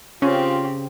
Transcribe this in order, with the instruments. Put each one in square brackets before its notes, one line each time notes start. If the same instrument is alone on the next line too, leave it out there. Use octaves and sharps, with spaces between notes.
[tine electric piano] C#3 [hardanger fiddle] C4 G4 [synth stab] C#4 [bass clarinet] F4